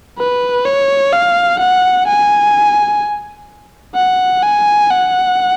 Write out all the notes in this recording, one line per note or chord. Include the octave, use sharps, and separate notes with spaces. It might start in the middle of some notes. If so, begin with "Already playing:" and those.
B4
C#5
F5
F#5
G#5
F#5
G#5
F#5